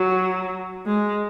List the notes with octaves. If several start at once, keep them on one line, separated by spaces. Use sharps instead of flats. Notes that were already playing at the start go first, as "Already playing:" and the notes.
Already playing: F#3
G#3